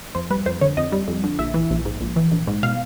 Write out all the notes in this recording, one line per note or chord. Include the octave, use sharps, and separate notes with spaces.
F2 C5
G3 B4
F2 C5
D3 C#5
F2 D#5
G3
F2
D3
A#1 E5
E3
A#1
G#2
A#1
E3
A#1
G#2
B2 F5